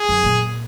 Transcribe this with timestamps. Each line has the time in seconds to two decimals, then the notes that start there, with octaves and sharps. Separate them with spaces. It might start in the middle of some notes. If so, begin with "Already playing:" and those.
Already playing: G#4
0.09 F#2
0.23 A#2